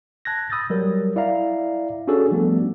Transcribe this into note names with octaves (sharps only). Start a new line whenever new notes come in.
A5 F#6 G#6 A#6
B5 D#6 E6 G6 A6
F#3 G3 A#4
E4 D5 E5 F5 A#5
C#4 D4 F#4 G#4 A4
F3 G3 A3 B3 D4